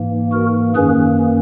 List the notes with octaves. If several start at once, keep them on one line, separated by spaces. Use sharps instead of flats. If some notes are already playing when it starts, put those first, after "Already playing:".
Already playing: G#2 E3 A#3
F#4 A#4
F#2 D#3 A#3 C#4 G#4 B4